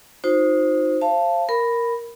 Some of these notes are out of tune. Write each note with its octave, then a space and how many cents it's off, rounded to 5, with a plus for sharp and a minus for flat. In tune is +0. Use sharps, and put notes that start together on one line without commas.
D#4 +0 F#4 -45 C5 +0
C5 +30 F5 -25 A5 +0
A#4 +0 B5 +0